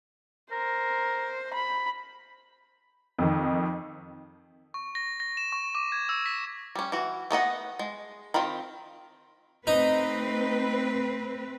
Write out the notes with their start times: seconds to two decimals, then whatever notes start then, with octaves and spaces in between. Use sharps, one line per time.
0.51 A#4 C5
1.54 B5
3.18 F2 D#3
4.74 C#6
4.95 A#6
5.20 A#6
5.37 E7
5.52 C#6
5.75 D6
5.92 G#6
6.09 E6
6.26 B6
6.75 G3 C#4
6.92 E3 F#4
7.31 A3 B3 D#5 F#5
7.79 G#3
8.34 D#3 C4 F4 B5
9.67 A3 C4 D#4 B4